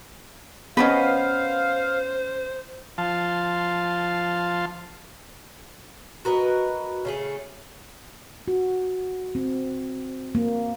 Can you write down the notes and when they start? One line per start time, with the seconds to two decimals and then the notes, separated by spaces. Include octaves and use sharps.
0.77 B3 C#4 D4 B4 C5 D#5 F5
2.98 F3 F5 A5 C6
6.25 F#4 A#4 B4 D#5
7.05 C#3 A3 G#4
8.48 F#4
9.35 C4
10.35 A#3